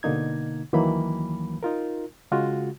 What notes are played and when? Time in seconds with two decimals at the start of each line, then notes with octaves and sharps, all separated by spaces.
0.03 B2 D3 A#3 D#4 G#6
0.73 D2 D#3 E3 F#3 A#3 B5
1.63 D#4 F4 A#4
2.31 C#3 G#3 F4 F#4